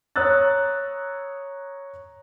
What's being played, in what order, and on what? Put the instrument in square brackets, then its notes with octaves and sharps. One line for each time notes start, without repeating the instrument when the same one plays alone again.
[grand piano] C#5 A#5 D#6 E6 F#6 A6